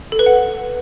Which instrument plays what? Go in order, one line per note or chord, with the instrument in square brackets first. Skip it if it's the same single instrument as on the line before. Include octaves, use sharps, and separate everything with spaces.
[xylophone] A4
B4
F#5